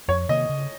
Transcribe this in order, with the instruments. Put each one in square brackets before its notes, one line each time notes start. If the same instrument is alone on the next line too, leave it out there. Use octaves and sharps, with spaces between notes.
[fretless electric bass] F2 [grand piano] C#5
[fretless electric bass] C3 D#3 A#3 [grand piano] D#5
[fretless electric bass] C#3